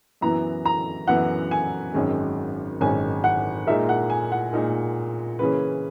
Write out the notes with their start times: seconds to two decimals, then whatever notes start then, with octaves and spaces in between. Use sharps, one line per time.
0.21 F#2 E3 B3 E4 A#5
0.65 A#5
1.08 F#2 E3 B3 E4 F#5
1.51 G#5
1.94 G#1 F#2 D#3 G#3 C#4
2.81 G#1 F#2 D#3 G#3 C#4 G#5
3.24 F#5
3.67 A#2 G#3 D#4 A#4 E5
3.89 F#5
4.10 G#5
4.32 F#5
4.53 A#2 G#3 D#4 A#4
5.39 C#3 E3 A#3 C#4 G#4 B4